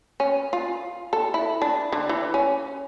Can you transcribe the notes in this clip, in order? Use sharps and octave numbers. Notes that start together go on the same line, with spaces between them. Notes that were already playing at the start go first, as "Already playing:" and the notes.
C#4
F4
A4
E4
D4
D3
E3
C#4